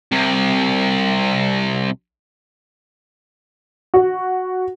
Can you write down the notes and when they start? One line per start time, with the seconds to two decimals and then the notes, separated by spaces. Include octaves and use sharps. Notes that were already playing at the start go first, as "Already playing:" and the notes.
0.12 C2 C3
3.94 F#4